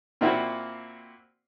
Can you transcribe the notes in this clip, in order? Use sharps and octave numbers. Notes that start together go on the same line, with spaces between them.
A#2 A#3 C4 E4 F#4